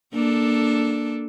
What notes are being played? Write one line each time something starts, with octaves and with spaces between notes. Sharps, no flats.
A#3 D4 A4